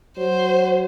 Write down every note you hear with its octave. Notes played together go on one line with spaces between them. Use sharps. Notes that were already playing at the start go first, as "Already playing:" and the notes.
F#3 C5